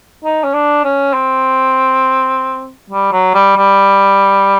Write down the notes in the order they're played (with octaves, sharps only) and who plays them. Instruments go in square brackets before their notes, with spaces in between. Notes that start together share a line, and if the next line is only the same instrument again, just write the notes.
[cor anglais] D#4
C#4
D4
C#4
C4
G3
F#3
G3
G3